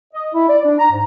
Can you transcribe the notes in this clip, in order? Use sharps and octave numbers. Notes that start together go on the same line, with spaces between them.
D#5
E4
D5
D4
A#5
G#2